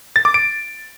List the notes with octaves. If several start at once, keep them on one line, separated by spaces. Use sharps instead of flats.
A6
D6
D7